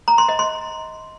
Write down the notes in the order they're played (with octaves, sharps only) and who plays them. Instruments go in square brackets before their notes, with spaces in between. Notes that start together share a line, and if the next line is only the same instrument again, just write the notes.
[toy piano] A#5
C6
D#5
C6